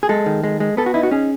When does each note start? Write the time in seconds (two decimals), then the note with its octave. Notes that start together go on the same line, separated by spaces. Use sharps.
0.03 G#4
0.09 G#3 A4
0.26 D#3
0.43 G#3
0.60 G#3
0.77 B3 A4
0.86 F#4
0.94 D#4 E4
1.03 F#4
1.11 C#4 G#4